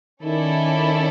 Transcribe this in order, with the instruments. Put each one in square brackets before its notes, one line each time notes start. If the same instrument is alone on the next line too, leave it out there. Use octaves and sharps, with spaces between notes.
[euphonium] D#3 [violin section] C#4 E4 A4 D5